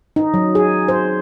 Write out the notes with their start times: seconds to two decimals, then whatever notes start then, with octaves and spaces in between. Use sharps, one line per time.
0.16 D#4
0.34 F#3
0.55 G#4
0.88 C5